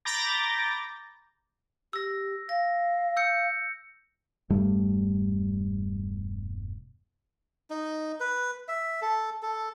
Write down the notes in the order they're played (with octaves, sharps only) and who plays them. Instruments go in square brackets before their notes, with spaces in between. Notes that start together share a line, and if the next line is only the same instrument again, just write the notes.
[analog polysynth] A#5 B5 D6 G6 A6 A#6
[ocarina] G4 [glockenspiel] E6 A#6
[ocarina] F5 [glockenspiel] A#6
[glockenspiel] E6 G6 C#7
[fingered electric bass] E1 G2 G3 A3
[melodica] D#4
B4
E5
A4
A4